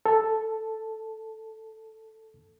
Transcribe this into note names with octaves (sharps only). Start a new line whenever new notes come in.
A4 A5